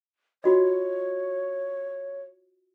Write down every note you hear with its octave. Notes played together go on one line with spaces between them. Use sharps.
F4 F#4 C#5 D#5